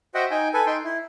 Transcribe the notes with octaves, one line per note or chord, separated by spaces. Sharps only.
F#4 C5 D#5 E5 F#5 G5
D#4 G5 G#5
A4 B4 G#5
D#4 G5 C6
E4